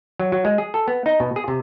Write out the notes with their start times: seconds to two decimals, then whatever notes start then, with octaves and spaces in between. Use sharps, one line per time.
0.20 F#3
0.32 F#3
0.45 G#3
0.58 G#4
0.74 A4
0.88 B3
1.06 D#4
1.20 B2
1.36 G#4
1.48 C3